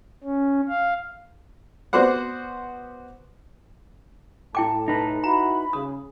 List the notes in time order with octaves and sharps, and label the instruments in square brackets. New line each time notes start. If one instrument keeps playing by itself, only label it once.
[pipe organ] C#4
F5
[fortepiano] B3 F#4 C5 D5 F#5
[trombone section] A2 [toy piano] E4 G5 D6 [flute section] A5
[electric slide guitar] D#4 B4
[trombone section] E4 F#4 [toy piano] A#5 [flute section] B5
[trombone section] C#3 [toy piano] D#6